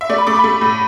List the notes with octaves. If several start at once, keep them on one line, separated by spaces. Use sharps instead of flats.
E5
A3 D5
B5
A3 D6
B5
A3
A2